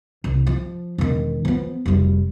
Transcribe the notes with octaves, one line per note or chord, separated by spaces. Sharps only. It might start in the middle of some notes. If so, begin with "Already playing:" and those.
C2
F3
E1 D#3
F3 B3
F1 G3